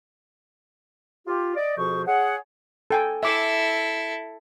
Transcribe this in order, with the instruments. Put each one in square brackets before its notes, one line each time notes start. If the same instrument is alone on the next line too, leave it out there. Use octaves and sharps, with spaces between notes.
[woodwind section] F4 G4
D5 D#5
F2 B2 F3 G#4 C5 C#6
G#4 C#5 F#5
[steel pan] A4 G5 G#5
[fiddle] E4 A4 [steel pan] E5 D6